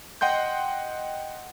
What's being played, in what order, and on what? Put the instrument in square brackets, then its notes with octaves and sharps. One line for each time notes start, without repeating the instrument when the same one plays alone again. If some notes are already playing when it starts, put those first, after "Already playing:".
[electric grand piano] D#5 F#5 G5 C6 G6